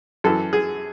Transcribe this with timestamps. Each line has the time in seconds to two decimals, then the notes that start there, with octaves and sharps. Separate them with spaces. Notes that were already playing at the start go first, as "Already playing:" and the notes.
0.24 F#2 E3 A4
0.53 G#4